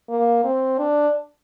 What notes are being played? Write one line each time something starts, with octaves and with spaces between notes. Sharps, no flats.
A#3
C4
D4